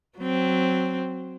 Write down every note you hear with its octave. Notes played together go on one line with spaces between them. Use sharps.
F#3 C4